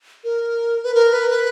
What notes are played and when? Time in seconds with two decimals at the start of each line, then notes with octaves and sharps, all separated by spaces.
0.24 A#4
0.85 B4
0.94 A#4
1.13 B4
1.31 B4